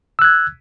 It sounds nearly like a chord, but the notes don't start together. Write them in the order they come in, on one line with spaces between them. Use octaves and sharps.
E6 F#6 G#6